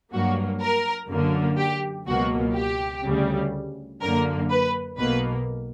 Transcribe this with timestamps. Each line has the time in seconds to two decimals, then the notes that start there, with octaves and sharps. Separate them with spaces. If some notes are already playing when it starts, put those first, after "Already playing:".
0.13 G2 F#3 A#3 F#4
0.61 A#4
1.10 F#2 D3 A#3
1.58 G4
2.07 C#2 B2 F#3 A#3 F#4
2.55 G4
3.04 D2 C#3 G3
4.01 F#2 D3 A#3 A#4
4.50 B4
4.99 B1 B2 A#3 B4